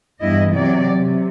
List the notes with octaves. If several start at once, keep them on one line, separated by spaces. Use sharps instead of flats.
E2 G2 E4 D#5
C3 F#3 D5
C3